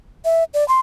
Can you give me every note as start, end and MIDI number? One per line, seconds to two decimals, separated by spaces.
0.25 0.44 76
0.54 0.67 74
0.68 0.80 84